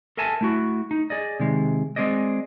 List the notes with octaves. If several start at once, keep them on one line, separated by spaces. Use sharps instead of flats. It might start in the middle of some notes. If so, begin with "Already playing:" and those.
A4 A#4 E5 G#5 A5
A3 E4 F#4
D#4
G#4 D5 D#5
C3 D#3 G#3
G#3 C4 G#4 D5 D#5